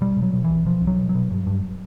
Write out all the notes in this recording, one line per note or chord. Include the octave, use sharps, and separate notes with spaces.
B2 G3
B2
F#3
B2
C2 E3
B2 F3
C2
F#3
B2
F#3
B2
G2
G2